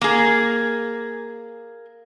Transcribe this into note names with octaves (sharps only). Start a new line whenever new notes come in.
A#3 G#4